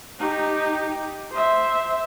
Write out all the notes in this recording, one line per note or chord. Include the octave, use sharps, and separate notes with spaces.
D#4 G4
C5 E5